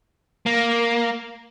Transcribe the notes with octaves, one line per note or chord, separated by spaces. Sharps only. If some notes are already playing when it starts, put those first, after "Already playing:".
A#3